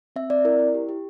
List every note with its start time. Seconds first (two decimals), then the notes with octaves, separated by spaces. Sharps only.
0.16 C4 E5
0.30 C4 D5
0.45 E4 A#4
0.59 E4
0.74 G4
0.89 G4